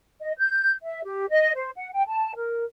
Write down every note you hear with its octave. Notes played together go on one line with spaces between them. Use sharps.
D#5
G6
E5
G4
D#5
C5
F#5
G5
A5
A#4